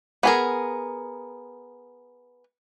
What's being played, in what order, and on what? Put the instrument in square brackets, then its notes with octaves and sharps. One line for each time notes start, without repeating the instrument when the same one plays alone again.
[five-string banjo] B3 G#4 A#4